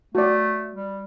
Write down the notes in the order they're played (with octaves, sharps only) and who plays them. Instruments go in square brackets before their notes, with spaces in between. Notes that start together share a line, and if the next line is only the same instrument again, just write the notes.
[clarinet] A3 [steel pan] F#4 D5
[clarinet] G3